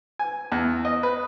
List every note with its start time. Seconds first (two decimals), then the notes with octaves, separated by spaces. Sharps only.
0.19 G#5
0.52 E2
0.85 D#5
1.03 B4